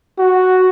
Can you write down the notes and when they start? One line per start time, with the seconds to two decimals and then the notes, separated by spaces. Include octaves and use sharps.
0.19 F#4